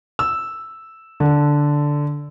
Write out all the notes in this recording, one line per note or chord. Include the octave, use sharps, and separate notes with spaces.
E6
D3